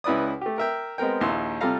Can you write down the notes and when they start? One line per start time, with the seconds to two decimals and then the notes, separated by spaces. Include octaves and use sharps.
0.04 C#2 E4 B4 D5 D#6
0.41 A3 G4
0.58 A#4 E5 G5
0.98 G#3 B3 C4 A#4 G5
1.21 A#1 D#2 E4 C6 E6
1.61 C3 G3 F4 A4 F5 A#5